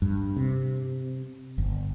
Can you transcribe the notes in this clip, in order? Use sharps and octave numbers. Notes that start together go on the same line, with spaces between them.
G2
C3
G1